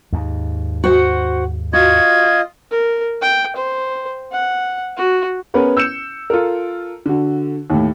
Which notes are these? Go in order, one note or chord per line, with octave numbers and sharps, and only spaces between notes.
D#2 G#2
F#4 C5 F#5
F4 F#4 D#5 G#6
A#4
G5
C5
F#5
F#4
B3 C#4 G#4 A#4 B4 C#5
E6 G6 C#7 E7
F4 A4 A#4
D3 F#4
D#2 A2